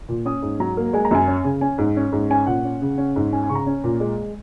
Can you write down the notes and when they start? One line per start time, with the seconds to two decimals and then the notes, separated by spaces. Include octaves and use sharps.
0.09 A#2
0.25 C#4 D#6
0.42 G#2
0.60 F#3 A#5
0.77 A#3
0.93 G#3 G#5
1.05 A#5
1.11 F#2 G#5
1.28 C#4
1.44 C#3
1.61 C#4 G#5
1.78 G#2
1.97 C#4
2.12 G#2
2.30 C#4 G#5
2.47 A#2 F#5
2.64 C#4
2.82 C#3
2.98 C#4
3.16 G#2
3.32 C#4 G#5
3.43 G#5
3.49 C#3 C#6
3.55 A#5
3.67 C#4
3.84 A#2
4.00 G#3